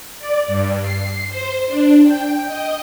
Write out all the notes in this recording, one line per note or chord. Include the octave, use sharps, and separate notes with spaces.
D5
G2
C7
C5
D4
G5
D#5